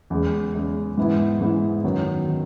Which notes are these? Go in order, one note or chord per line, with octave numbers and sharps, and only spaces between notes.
E2 C#3 G#3
E2 C#3 G#3
G#2 E3 B3 E4
G#2 E3 B3 E4
F#2 D#3 F#3 B3
D#3